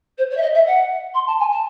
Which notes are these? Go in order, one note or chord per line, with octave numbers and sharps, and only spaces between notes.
C5
C#5
E5
D#5
E5
F#5
C6
A5
G#5
A5